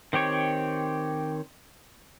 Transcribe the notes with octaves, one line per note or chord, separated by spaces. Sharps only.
D#3 C4 G4 C#5